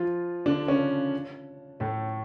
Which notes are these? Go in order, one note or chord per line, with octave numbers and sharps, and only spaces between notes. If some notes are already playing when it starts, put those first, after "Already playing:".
Already playing: F3 F4
D3 D4
C#3 C#4
A2 A3